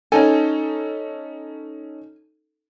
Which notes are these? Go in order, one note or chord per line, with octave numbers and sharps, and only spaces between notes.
C#4 D#4 A4 G#5